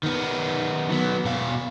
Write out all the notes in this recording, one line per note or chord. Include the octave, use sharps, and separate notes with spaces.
D#3 B3
F#3 B3
B2 F5